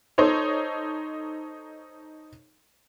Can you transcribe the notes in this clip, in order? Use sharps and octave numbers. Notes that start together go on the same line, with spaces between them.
D#4 A4 C5 C#5